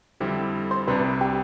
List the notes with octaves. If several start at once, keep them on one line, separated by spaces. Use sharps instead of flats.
F2 D3 G3 C4 E4
C5
C2 C3 G3 D4 B4
G4